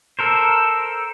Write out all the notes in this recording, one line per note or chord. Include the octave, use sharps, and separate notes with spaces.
A4 A#4 C5